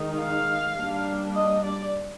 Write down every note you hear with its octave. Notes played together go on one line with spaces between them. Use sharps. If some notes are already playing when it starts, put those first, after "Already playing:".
Already playing: D#3 G#3 D#4
F5
G3 A#3 D4
D#5
D5